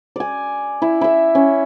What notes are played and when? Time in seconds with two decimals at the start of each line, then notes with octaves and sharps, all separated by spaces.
0.16 D5 G#5
0.82 E4
1.01 E4 E5
1.35 C#4